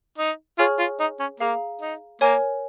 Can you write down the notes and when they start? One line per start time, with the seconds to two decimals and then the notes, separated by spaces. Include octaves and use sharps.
0.18 D#4
0.58 F4 G#4 C#5 G#5 C#6 F6
0.79 F4
1.00 D#4
1.20 C#4
1.40 A#3 G#4 F5 A#5
1.81 D#4
2.21 A#3 A#4 C#5 G#5